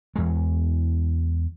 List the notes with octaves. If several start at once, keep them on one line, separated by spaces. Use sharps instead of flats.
E2 G#3